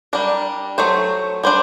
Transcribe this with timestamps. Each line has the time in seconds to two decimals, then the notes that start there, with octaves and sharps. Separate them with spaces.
0.13 G3 D4 A#4
0.78 F#3 A3 C5
1.43 G3 D4 C5